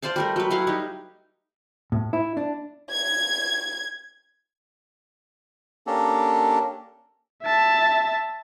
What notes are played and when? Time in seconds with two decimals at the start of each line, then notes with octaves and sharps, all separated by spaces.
0.02 C5 D5 F5 A5
0.16 G3 A3 A#4
0.36 F#3 B4
0.50 F#3 E4 F5 F#5
0.67 G3 D#4 G4
1.92 A2
2.13 E4
2.37 D4
2.92 G#6
5.87 A#3 C#4 D4 G4 A4
7.43 E5 A5